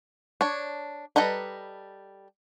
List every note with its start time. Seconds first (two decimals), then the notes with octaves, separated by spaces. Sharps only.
0.41 D4 C#5
1.16 G3 A4 B4 D#5 A#5